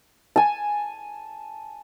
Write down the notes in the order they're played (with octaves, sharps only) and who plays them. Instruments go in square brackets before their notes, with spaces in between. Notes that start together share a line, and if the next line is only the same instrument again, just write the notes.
[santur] G#5 A5